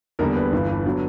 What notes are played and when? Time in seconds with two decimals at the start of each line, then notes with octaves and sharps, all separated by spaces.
0.19 E2 D3 G3 A#3 A#4
0.36 B4
0.52 G1 G2 E3
0.86 D3 F#3 B3